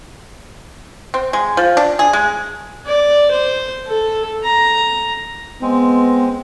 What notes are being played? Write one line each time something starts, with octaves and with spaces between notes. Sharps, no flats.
C4
G#3
F3
D4
G#4
G#3
D5
C5
A4
A#5
G#3 B3 C4